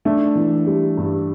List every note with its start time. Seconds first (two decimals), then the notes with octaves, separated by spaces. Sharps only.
0.05 A3 D4
0.35 E3
0.67 G3
0.97 G2